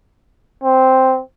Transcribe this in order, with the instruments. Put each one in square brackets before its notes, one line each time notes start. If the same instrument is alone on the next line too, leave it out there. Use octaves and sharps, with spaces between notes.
[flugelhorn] C4